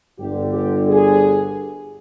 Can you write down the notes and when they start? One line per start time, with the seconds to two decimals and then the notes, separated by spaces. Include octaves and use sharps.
0.18 G1 G2 D3 G4
0.53 G4
0.87 G#4